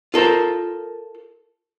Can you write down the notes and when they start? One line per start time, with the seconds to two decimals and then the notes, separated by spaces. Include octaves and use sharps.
0.14 F4 A4 A#4 C5